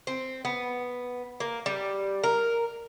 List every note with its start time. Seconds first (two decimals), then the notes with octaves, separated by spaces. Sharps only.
0.07 C4
0.45 B3
1.40 A#3
1.66 G3
2.24 A#4